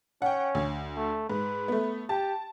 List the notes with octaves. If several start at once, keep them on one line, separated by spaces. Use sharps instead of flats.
C#4 F#5 G5
D2
A3
G#2 B4
A3 B3
G4 A5